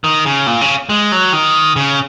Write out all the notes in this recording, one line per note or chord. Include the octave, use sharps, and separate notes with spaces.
D#3
C#3
A#2
C#3
G#3
F#3
D#3
C#3